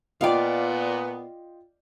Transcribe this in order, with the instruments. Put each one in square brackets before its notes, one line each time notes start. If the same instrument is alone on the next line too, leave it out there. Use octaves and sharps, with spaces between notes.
[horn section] A#2 B3 [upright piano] F4 D#5 G5 [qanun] D5 F5